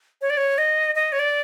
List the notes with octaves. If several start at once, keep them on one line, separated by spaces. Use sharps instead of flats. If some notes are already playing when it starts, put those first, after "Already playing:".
C#5
D5
C#5
D#5
D#5
C#5
D5